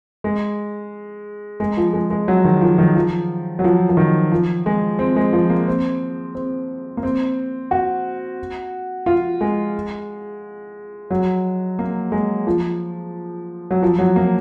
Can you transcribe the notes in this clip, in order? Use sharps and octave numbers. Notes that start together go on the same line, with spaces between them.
G#3
G#3
F3
G#3
G#3
F#3
D#3
F3
D#3
F3
F#3
F3
F3
D#3
F3
G#3
C4
G#3
F3
A#3
C4
C4
A#3
C4
F#4
F4
G#3
F#3
A#3
G#3
F3
F#3
F3
F#3
A#3